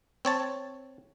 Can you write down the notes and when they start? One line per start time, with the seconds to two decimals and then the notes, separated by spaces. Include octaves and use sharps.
0.25 C4 C#5 A5